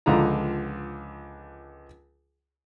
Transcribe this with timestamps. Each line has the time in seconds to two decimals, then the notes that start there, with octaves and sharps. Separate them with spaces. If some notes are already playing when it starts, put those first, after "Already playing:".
0.06 C#2 D3 F3 F5 A#5